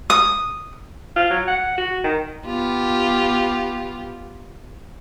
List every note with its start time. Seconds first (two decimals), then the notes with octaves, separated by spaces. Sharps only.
0.10 D#6
1.16 F4
1.30 F#3
1.48 F#5
1.78 F#4
2.04 D#3
2.46 B3 F4 G4